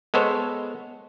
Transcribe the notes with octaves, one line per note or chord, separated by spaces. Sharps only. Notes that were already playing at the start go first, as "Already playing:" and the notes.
G#3 B3 A4 C5 C#5